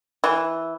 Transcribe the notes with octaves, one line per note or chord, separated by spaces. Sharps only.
E3